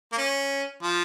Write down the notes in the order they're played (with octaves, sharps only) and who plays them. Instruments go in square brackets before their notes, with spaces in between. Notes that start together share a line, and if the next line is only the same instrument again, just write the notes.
[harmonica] A#3
C#4
F3